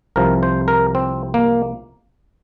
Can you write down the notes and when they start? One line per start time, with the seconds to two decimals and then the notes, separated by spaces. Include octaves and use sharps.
0.16 C2 C3 F3 A#4
0.43 C5
0.68 A#4
0.95 C4
1.34 A#3